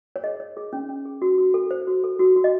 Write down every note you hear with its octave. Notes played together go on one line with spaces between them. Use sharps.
C#5
G#4 D#5
C#5
G#4
C#4
C#4
G#4
F#4
F#4
A4
C5
F#4
A4
F#4
F#4
D#5